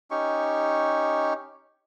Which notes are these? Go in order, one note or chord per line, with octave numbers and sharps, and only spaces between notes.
C#4 D#4 G4 C#6